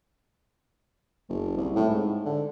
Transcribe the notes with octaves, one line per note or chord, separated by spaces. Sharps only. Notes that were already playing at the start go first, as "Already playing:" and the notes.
F#1
C2
A2
G#2
D3